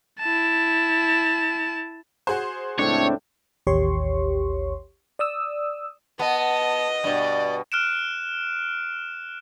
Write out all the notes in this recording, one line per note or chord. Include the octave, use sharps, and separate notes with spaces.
E4 A5
F#4 G#4 C5
C#2 A2 C4 D4 C#5
A1 D#2 G4 C#5 C6 C#6
D5 D#6 E6
B3 D#5 A5
G2 B2 D5
F6 F#6 D7 E7